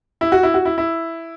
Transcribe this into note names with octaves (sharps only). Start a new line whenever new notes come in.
E4
F#4
E4
F#4
E4
E4